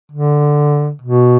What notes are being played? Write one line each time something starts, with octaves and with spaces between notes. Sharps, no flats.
D3
B2